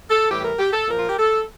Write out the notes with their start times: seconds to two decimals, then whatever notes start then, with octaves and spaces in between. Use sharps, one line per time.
0.10 A4
0.30 A2 E3 G3 G4
0.45 A#4
0.59 G4
0.73 A4
0.88 A#2 F3 A#4
0.98 F4
1.08 G4
1.18 A4